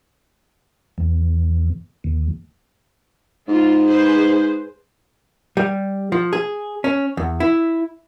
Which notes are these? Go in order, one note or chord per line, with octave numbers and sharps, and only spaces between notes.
E2
D#2
G#2 F4
G#4 B4 C5
G3
F3
G#4
C#4
E2
E4